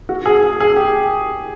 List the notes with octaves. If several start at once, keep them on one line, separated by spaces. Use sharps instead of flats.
F#4
G#4
G#4
G#4
G4